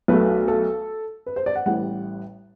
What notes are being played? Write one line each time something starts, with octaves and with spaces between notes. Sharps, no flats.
B1 B2 A3 B4
A4
B4
C5
D5
F#5
A1 A2 G3 F#5